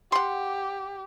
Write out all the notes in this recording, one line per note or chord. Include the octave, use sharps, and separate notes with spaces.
G4 F#5 C6